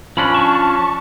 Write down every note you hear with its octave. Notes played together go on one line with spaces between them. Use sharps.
F3 C#4 D4 B5
A5 C#6